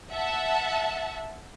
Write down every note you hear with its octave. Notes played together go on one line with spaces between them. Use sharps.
E5 F#5 A5